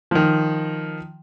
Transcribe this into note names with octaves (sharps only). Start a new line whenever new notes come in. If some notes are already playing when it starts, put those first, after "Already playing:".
D#3 F3